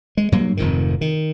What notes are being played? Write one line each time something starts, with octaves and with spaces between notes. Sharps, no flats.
G#3
G2 F#3 A#3
F1 F2 G#2 D#3
D#3